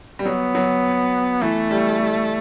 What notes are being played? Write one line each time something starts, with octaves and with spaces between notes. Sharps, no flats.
G3
F#3 B3
F#3
E3 A3
G3
G3